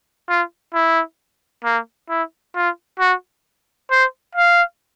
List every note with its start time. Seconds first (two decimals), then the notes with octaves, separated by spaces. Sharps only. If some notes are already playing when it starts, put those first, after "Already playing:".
0.29 F4
0.74 E4
1.64 A#3
2.09 E4
2.56 F4
3.00 F#4
3.91 C5
4.35 F5